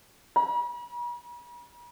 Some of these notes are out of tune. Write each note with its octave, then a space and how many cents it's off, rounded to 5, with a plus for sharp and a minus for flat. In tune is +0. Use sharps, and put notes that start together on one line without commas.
B5 -45